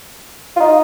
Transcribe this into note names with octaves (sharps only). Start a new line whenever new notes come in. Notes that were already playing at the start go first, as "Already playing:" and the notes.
F4
D#4